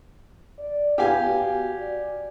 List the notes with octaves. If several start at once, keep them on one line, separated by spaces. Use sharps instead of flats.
D5
B3 G4 F5 G#5
F#4
D5